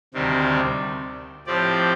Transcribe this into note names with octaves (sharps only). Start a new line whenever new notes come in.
D2 C3 D#3 G3 C4
A2 F3 C4 G4 D5